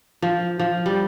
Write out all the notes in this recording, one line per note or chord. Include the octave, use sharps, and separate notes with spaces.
F3
F3
G3